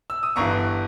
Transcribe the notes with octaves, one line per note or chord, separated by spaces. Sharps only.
E6
D#6
G1 G2 E3 A#5 C#6